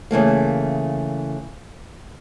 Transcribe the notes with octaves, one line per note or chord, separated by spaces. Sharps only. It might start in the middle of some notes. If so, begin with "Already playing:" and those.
C#3 E3 A3 A#3